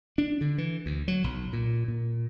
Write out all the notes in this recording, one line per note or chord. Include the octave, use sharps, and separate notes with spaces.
D4
D3
E3
D2
F#3
B1
A#2
A#2